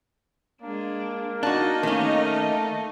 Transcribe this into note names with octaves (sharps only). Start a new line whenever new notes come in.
G#3 A#3 D4
D4 D#4 F#4 D#5 A5
D#3 A3 C#4